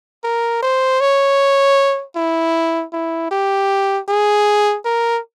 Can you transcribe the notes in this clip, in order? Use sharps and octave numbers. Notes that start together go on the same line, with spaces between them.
A#4
C5
C#5
E4
E4
G4
G#4
A#4